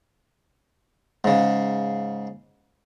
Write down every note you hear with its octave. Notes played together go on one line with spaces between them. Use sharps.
G#2 C#3